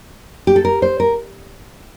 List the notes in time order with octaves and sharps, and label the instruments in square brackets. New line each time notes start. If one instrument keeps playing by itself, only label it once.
[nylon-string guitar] G4
A4
A#4
C5
A#4